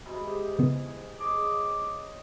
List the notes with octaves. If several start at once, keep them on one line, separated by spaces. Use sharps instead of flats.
G#2 C3 E3 F#4
G4 G#4
C#3 B3 E4
G#4 C#5 D#5 D6